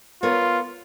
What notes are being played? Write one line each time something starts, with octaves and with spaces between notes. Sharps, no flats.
B3 F4 A#4 C#5